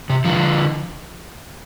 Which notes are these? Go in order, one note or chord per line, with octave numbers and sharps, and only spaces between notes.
C3
D3 F3